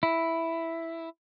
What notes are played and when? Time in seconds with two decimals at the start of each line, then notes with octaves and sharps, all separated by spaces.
0.03 E4